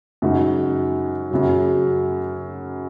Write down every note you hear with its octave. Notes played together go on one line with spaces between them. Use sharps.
F#2 C#3 G#3 D#4 F#4
F#2 C#3 F#3